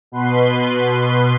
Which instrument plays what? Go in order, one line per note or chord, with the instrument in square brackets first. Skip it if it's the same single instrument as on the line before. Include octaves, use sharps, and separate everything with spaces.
[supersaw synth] B2 B4 C6